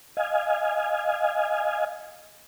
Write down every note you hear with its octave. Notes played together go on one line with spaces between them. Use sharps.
D#5 F5 G#5